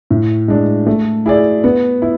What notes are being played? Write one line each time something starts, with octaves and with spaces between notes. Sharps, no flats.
A2
G#3 D4
A3
E4 G#4 D5
B3
E4